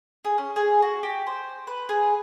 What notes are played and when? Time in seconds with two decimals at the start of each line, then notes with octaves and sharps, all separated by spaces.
0.25 G#4
0.38 C#4
0.56 G#4
0.82 F#4
1.03 G4
1.27 C5
1.67 B4
1.89 G#4